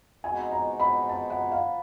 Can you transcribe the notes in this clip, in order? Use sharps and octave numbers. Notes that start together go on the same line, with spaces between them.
B2 G#3 C4 D#4 F#4 G#5
A#5
B5
A5
F#5
F5